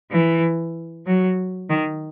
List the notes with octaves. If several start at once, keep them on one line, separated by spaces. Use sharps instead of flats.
E3
F#3
D#3